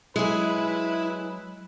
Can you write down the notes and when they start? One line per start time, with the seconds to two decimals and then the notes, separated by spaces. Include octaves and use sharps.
0.16 F#3 G#3 E4 G#4 B4